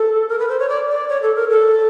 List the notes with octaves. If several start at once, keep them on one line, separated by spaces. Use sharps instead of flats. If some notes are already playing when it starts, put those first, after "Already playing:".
Already playing: A4
A#4
B4
C5
C#5
D5
D5
C#5
A4
A#4
A4